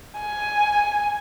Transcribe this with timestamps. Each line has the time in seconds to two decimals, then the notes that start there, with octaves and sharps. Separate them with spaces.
0.19 G#5